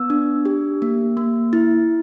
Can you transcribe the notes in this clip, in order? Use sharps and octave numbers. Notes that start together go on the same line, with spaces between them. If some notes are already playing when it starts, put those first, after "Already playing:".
Already playing: B3 E6
D4
G4
A#3
A#3
E4